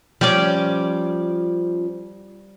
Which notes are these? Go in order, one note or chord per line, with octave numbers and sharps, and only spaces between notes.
F3 G3 C#4 D5